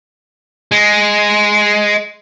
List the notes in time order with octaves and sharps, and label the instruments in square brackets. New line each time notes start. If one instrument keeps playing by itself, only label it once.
[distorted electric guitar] G#3